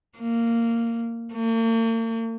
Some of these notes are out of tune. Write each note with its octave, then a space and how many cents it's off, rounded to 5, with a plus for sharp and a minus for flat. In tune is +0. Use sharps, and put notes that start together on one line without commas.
A#3 -10
A#3 -45